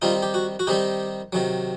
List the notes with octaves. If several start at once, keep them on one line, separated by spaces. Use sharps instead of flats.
D#3 G3 C4 D#4 F4
G4
F#4
F#4
D#3 G3 C4 D#4 G4
C3 D#3 F#3